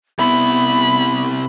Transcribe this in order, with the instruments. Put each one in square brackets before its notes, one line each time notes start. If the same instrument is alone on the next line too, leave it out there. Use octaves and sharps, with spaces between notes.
[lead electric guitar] C3 E4 [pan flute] B3 [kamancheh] B5